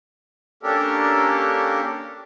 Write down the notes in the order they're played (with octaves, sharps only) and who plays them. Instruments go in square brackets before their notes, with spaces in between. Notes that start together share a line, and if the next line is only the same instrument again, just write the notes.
[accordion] A#3 C#4 D4 G4 A4 A#4